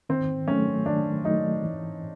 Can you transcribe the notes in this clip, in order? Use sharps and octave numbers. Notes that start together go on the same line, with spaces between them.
D#3 C4
F#3 A3 C#4
D#3 D4
F#3 A3 D#4
E3